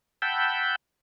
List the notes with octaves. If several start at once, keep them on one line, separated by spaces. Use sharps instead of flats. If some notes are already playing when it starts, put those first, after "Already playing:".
F#5 G5 A5 B5 E6 G6